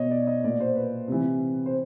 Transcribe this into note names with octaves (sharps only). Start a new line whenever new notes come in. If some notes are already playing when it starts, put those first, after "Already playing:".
Already playing: B2 C#5 D#5
D5
D#5
A#2 D5
C5
B4
C3 E3
C5